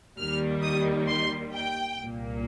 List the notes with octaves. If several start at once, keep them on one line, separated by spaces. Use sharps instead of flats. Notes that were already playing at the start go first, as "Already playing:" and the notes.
D#2 D#3 G3 A#3 F6
D#6
C6
G5
C2 A#2 A#3